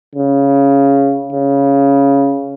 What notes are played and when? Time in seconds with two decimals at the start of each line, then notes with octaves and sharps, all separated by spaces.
0.15 C#3
1.33 C#3